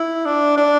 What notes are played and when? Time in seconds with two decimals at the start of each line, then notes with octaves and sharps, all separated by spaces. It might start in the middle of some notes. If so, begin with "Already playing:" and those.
Already playing: E4
0.26 D4
0.57 D4